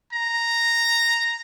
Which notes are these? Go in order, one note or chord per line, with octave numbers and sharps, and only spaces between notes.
A#5